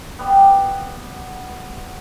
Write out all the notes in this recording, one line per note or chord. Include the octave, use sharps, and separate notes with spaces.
G3 B3